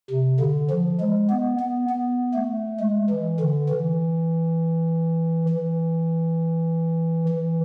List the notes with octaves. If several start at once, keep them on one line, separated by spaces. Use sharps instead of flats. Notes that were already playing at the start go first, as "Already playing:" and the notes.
C3
D3
F3
G#3
B3
B3
B3
A3
G#3
E3
D3
E3
E3
E3